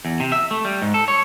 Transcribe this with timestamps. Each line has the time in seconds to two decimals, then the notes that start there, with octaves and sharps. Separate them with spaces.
0.05 E2
0.20 C3
0.32 E5
0.51 A3
0.65 G3
0.82 G#2
0.94 A4
1.08 C#5